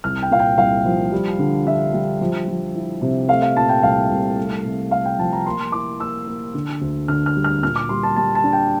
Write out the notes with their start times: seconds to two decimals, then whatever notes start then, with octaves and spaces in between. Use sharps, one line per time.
0.04 C2 F6
0.22 G5
0.31 A#2 F5
0.39 G5
0.58 C2 F5
0.85 F3
1.12 G3
1.39 D3
1.66 D4 E5
1.94 G3
2.21 F3
2.48 F3
2.75 E4
3.01 C3
3.29 A3 F5
3.42 F5
3.56 A#2 A5
3.69 G5
3.83 C2 F5
4.10 C2
4.37 A3
4.65 C3
4.91 A3 F5
5.05 G5
5.18 F3 A5
5.33 A#5
5.46 A#3 C6
5.72 E4 D6
6.00 A#3 E6
6.27 A#3
6.54 D3
6.81 D2
7.08 D3 F6
7.26 F6
7.36 G3
7.44 F6
7.63 A#2 F6
7.76 D6
7.89 G3 C6
8.03 A5
8.16 G3 A5
8.35 A5
8.44 D4
8.53 G5